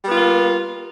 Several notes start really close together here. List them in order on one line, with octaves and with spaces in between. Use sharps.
G3 B3 F4 A#3